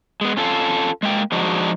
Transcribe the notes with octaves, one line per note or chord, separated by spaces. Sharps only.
G#3 B3
C#4 F4 A4
G#3 A#3 G5
F3 G#3 D4 D#4 F#4